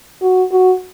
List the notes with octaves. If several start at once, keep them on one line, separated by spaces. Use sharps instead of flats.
F#4
F#4